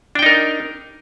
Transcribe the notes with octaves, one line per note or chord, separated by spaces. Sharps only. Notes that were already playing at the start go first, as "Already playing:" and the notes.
D4 D#4 A#4 G5